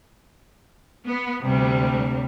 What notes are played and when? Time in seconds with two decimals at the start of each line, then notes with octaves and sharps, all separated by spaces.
1.06 B3
1.41 D2 C3 G3